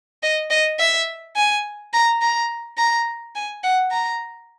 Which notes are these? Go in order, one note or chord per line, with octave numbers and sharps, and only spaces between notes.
D#5
D#5
E5
G#5
A#5
A#5
A#5
G#5
F#5
A#5